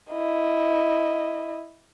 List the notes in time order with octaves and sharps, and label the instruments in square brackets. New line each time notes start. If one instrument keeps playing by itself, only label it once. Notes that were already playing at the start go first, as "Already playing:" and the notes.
[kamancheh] E4 D#5